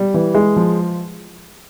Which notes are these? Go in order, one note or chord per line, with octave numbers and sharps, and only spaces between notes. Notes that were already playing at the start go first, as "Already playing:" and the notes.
Already playing: G3
E3
G#3
F3